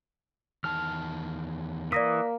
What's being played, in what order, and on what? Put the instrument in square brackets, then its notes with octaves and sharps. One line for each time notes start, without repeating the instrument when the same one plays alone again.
[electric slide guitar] E2 D#3 A5 [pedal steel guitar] F6
[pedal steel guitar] E3 D#6 [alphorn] A#3 [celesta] D5 A#6 B6